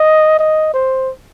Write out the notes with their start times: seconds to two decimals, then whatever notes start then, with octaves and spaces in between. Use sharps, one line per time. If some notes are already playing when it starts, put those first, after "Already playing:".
Already playing: D#5
0.39 D#5
0.74 C5